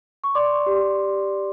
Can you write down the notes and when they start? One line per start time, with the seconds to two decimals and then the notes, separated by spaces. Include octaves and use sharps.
0.24 C#6
0.35 D5 C6 D6
0.66 G4